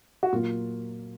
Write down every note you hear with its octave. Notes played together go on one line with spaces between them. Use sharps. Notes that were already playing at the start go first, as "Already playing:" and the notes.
F#4
A#2 F#3 A#3 F4